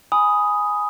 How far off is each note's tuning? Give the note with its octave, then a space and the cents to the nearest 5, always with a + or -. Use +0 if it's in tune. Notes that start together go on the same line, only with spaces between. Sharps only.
G#5 +0 B5 +0 D#6 +5